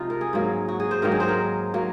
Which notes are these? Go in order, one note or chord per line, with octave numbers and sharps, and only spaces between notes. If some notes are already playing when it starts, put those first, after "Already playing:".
Already playing: C3 F3 G#3 D#4 F4
A#4
G#4
G#2 F#3 A#3
F#4
G#4
C5
G#2 D#3 F#3 A#3 A#4
G#4
C5
A#4
F#3 A#3